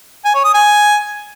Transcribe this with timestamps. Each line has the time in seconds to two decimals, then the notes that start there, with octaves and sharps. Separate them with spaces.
0.25 G#5
0.35 C#5
0.44 D#6
0.54 G#5